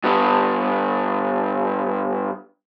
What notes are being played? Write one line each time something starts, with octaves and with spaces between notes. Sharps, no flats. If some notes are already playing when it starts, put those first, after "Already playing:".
G2 B3